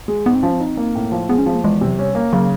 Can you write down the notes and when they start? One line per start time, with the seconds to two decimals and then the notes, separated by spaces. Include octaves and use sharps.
0.08 G#3
0.26 G#2 B3
0.35 C4
0.43 F3 C#4
0.52 C4
0.60 D#4
0.77 A#3
0.95 A2
1.12 F3
1.29 G#3 B3
1.39 C#4
1.46 F3 C4
1.55 A#3
1.63 E2 G#3
1.81 C3
1.87 F#3
1.99 G3 C#4
2.15 A#3
2.33 C#3 F#3